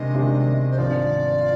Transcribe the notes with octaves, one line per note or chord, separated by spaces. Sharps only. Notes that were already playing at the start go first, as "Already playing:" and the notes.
Already playing: C3 D#3 G#3 D4 D#5
C3 D#3 G#3 D4
C5
G#1 G2 F3 C4 F4 D5
F4